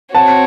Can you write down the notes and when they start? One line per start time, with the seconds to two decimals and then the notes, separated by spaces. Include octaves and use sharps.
0.15 C4 F#4 C#5 F#5 A5